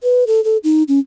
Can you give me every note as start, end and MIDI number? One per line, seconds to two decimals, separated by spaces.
0.03 0.24 71
0.27 0.43 69
0.44 0.57 69
0.64 0.83 63
0.88 0.99 61